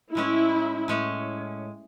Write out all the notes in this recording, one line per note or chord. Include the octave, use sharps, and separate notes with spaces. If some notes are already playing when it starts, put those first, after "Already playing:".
A2 G#3 C#4 E4
A2 G#3 C#4